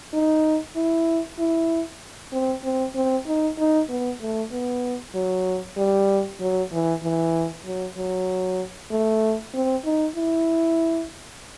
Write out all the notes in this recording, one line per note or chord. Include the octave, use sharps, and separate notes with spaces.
D#4
E4
E4
C4
C4
C4
D#4
D#4
B3
A3
B3
F#3
G3
F#3
E3
E3
F#3
F#3
A3
C4
D#4
E4